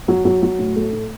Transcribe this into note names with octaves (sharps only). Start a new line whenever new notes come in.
F#3
F#3
F#3
A2
A3
A2